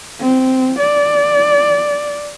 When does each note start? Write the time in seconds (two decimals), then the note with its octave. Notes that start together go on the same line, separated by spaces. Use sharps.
0.20 C4
0.79 D5